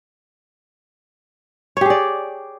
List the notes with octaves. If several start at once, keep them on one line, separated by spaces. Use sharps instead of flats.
G4 G#4 C#5 D5